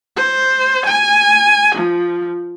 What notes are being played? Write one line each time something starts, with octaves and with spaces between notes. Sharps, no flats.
C5
G#5
F3